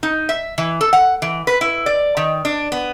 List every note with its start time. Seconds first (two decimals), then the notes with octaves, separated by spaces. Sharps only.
0.03 D#4
0.29 E5
0.58 E3
0.81 A4
0.93 F#5
1.22 E3
1.47 B4
1.61 E4
1.86 D5
2.17 D#3
2.45 D4
2.72 B3